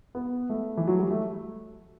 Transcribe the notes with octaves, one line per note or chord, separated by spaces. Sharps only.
B3
A3
E3
F#3
G3
A3